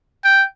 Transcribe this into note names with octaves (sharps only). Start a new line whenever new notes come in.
G5